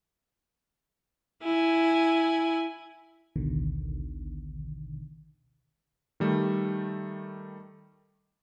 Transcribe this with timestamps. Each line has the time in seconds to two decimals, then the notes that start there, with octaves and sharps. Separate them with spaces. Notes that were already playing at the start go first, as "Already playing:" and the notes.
1.43 E4 G#5
3.36 A1 D2 B2 D3 D#3
6.20 D#3 G3 A3